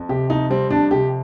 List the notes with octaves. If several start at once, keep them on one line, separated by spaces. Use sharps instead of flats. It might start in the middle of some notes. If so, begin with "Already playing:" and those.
Already playing: F2
C3 G4
F2 D#4
G3 C4
F2 D4
C3 G4